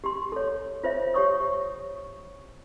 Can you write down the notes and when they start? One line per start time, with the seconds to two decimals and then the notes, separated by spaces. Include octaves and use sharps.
0.04 G4 C6
0.32 A4 C#5
0.84 F4 C5 C#5 E5
1.14 G4 C#5 C#6 D#6